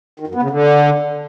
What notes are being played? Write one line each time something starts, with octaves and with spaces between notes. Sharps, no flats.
D#3
F#2
B3
C#3
D3